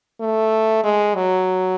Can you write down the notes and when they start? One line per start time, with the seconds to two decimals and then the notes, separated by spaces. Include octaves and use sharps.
0.21 A3
0.84 G#3
1.16 F#3